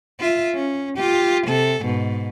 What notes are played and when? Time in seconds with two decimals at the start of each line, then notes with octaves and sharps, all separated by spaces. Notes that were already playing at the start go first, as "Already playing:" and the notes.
0.20 F4 E5
0.55 C#4
0.97 F4 G4
1.47 C3 A4
1.83 G#2 B2